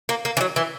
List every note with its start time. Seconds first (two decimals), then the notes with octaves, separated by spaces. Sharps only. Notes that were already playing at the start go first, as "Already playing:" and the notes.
0.09 A#3
0.25 A#3
0.37 E3
0.41 F#3
0.56 E3